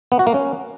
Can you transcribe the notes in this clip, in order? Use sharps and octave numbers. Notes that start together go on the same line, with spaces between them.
B3
F#4
A#3
C#4